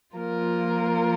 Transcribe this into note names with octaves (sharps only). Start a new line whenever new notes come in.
F3 A#3 F4 A#4